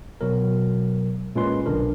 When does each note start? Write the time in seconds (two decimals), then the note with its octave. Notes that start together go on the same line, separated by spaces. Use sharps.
0.21 B2 F#3 A#4
1.36 A#2 G#3 C#4 F4 B4 C6
1.66 B1 D3 D4 A#4